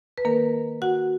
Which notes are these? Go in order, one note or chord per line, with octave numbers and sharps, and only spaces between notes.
B4
D#3 A#3 A#4
F#4 F#5